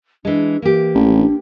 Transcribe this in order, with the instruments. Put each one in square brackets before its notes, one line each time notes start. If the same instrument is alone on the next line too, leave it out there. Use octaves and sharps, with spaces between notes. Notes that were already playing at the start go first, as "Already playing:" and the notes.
[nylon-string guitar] E3 G#3 [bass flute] D4
[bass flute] E3 [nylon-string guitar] A#3 G4
[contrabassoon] A1
[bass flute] D4